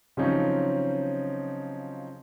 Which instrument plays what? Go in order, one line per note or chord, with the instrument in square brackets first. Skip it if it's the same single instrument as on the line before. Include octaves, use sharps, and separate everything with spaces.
[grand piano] C#3 F3 F#3 C4 C#4 D#4